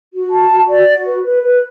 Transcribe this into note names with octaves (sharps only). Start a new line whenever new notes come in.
F#4
A5
F#4
D5
F#4
B4
B4
B4